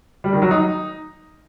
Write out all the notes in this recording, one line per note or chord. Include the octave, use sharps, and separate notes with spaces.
G3
D#3
F#3
D#4